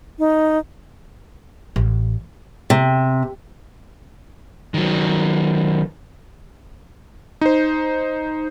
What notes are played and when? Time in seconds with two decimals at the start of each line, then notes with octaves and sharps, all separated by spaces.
0.19 D#4
1.76 A1
2.70 C3
4.74 D#3 F#3
7.41 D#4 C5